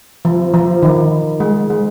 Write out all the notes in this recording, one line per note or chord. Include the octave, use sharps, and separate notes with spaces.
F3
F3
D#3
G#3
G#3